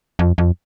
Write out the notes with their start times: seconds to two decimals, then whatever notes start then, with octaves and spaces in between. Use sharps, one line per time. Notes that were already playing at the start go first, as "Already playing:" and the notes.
0.19 F2
0.38 F2